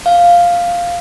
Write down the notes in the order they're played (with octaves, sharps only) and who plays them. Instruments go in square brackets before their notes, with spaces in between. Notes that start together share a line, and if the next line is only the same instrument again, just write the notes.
[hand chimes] F5